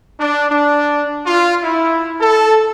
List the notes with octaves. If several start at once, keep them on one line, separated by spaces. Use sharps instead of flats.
D4
D4
F4
E4
A4